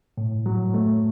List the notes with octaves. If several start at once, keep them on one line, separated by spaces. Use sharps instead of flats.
A2
F#3
A3